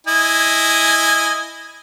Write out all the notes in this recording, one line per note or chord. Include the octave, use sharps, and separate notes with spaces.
E4 D#5 G#5